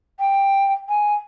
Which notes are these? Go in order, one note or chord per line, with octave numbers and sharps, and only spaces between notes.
G5
G#5